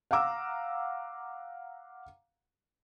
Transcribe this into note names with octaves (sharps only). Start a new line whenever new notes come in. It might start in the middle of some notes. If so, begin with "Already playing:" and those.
F5 F#5 A#5 D6 E6